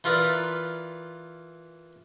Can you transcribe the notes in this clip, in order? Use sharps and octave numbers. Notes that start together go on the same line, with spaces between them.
E3 F4 A#4 B4 D5